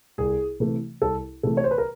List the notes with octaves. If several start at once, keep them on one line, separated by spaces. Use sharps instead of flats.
C2 G#4
C3 E3 A3
C2 A4
C3 E3 A3 A4
C#5
C5
B4
A#4